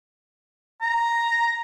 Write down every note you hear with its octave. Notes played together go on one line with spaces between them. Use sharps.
A#5